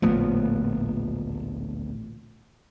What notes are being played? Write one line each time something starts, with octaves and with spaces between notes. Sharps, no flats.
D1 A1 D#2 A#2 F3 B3